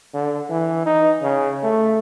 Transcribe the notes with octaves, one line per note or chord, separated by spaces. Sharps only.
D3
E3
D#4
C#3
A3